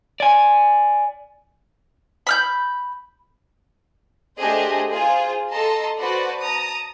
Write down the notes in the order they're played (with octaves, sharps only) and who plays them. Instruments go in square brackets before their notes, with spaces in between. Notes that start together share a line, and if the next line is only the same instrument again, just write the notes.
[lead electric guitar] D5 G#5
[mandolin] B5 F6 G6
[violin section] A3 D4 G4 G#4 C5 D#5
F4 G#4 C5
A4 D#5 A5 A#5 C6
F#4 B4 C5 D5 F#5 A5
A5 A#5 D#6